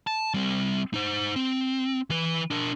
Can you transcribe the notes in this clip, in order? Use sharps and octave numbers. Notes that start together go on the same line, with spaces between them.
A5
G3 C4
D#4 C5
C4
E3 B4
D4 A#4